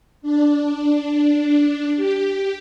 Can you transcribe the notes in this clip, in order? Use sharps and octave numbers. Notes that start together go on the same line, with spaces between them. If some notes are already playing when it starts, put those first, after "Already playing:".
D4
G4